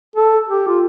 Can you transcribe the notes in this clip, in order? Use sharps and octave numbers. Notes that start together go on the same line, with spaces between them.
A4
G4
F4